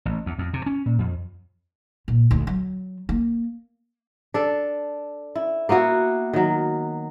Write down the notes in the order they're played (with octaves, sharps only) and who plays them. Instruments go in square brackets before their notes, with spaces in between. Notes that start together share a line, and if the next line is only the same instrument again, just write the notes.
[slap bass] A1
E2
F2
C3
C#4
A#2
F2
[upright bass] A#2
D2
F#3
A#3
[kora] D4 A4
E4
A#3 B3 E4 F#4
D#3 F#3